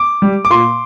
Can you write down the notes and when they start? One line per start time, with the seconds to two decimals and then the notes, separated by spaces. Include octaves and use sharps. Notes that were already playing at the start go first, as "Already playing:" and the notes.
Already playing: D6
0.22 G3
0.45 D6
0.50 A#2 C6